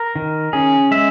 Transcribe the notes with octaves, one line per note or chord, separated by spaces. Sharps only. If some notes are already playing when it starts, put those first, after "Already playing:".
Already playing: A#4
D#3
C#4 G#4
G#3 E5